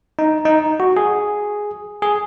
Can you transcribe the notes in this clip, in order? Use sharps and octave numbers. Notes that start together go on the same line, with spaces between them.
D#4
D#4
F#4
G#4
G#4